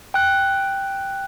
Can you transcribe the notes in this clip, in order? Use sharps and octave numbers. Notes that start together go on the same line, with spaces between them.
G5 F#6